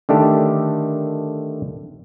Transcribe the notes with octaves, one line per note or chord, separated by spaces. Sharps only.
D3 D#3 A3 D4 G4 A4